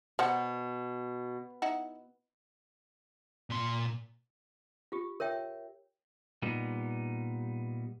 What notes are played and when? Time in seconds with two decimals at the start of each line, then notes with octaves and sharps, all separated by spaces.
0.19 B2 A#4 C5 F#5
1.62 D#4 E4 F#5
3.50 A#2 C6
4.92 F4 G4
5.20 A#4 C#5 E5 G5
6.42 A#2 G3 B3 D#4